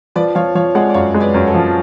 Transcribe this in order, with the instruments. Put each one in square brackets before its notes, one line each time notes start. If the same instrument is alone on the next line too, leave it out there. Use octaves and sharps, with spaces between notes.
[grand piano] F3 [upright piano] B4 D5
[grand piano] F3 [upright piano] C#5 F5
[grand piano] F3 [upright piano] C#5 F5
[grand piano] G#3 [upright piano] D5 F#5
[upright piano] D5
[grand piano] F#2 [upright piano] C#5 F5
[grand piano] G#3
[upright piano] B4 D5
[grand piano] F#2
[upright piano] A4 C#5
[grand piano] F3